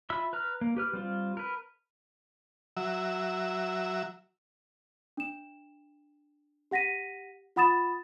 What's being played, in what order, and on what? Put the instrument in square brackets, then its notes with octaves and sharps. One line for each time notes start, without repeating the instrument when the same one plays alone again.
[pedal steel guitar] F4 E5 B5 E6
B4 A#5 F6
A#3
G4 B4 F6
G3 C4 F4
A#4 B4
[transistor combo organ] F#3 E5
[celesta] D4 E7
G4 F#5 A#6 B6 D#7
F4 F#5 B5 D#6 A6 E7